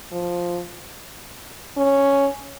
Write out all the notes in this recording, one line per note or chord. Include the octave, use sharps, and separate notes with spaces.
F3
C#4